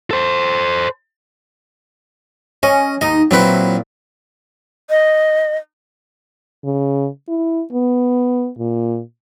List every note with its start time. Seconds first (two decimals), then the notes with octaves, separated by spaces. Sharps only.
0.11 A4 C5
2.63 C#4 D#5
3.01 D#2 D#4 D#5
3.31 A#2 F#3 C4 E4 B4
4.90 D#5
6.64 C#3
7.28 E4
7.72 B3
8.59 A#2